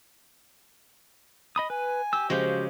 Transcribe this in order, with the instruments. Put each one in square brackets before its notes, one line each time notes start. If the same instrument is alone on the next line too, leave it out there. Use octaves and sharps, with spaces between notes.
[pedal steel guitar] D#5 B5 D#6
[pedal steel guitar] B4 [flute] G#5
[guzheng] G4 [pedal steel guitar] E6
[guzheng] C#3 F3 G#3 [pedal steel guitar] F#4 G4 [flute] C5